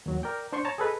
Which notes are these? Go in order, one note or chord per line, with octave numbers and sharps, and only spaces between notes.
D#2 F#3
A#4 D5 G5
D4 C5 D5 C6 C#6
C#5 A5 A#5
G#4 A4 B4 D#5